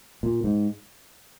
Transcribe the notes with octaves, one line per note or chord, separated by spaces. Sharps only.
A#2
G#2